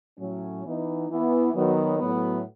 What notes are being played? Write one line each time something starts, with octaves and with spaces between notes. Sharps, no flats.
A2 F#3 C#4
E3 B3 D#4
E3 B3 E4
D#3 F#3 B3
A2 F#3 B3